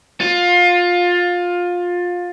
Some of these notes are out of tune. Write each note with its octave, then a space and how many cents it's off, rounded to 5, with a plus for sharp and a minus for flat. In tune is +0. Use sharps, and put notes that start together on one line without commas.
F4 +20